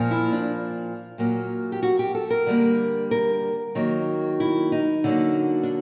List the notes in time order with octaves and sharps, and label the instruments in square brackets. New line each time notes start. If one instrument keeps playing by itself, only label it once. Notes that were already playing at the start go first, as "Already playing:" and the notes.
Already playing: [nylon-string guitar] A#2 F3 A#3
E4
D4
A#2 F#3 A#3
G4
F#4
G4
A4
A#4
D3 G3 A#3
A#4
D#3 F#3 A#3
E4
D#4
D3 F#3 A#3
D4